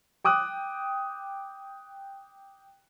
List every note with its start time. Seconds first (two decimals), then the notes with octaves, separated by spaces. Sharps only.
0.25 G5 D6 D#6 F#6